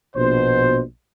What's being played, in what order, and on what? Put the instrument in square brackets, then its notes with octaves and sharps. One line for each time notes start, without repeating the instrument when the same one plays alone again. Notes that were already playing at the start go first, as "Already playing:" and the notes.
[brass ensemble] A#1 B2 C5